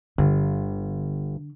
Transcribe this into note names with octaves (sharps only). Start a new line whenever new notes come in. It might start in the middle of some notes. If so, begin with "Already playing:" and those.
G1 D3